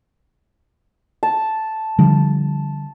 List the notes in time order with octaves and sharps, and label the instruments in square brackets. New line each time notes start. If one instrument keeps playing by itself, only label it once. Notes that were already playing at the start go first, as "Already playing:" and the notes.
[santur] A5
[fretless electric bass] D3 F3 G3